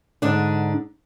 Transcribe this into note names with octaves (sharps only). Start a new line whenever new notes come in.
G#2 D3 D4